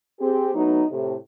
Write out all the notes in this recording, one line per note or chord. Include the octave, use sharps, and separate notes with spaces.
C4 G4 G#4
F#3 A3 B3 D#4
A2 C3